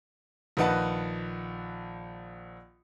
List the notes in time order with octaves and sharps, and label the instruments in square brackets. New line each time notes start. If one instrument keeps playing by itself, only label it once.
[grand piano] A#1 D#3 B4 D#5 F#5 A5